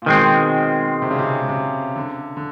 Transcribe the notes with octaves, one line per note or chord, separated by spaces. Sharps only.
A#2
B2 D#3 G#3 C4
C3
C#3
C3
C3
D3
D3